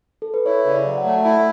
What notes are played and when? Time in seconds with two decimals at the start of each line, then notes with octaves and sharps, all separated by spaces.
0.22 A4
0.34 B4
0.45 E4 C#5
0.65 C#3
0.71 D5
0.85 F#3
0.98 F#5
1.04 A3
1.24 E4 A5